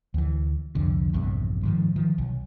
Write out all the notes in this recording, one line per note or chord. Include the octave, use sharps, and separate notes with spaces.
D2 E3
C2 F2 D3
A#1 E2 G2 C3
G#2 D#3 F3
D#3 F3
B1